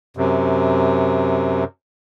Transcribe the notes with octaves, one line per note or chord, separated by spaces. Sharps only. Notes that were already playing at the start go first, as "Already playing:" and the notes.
F#2 C3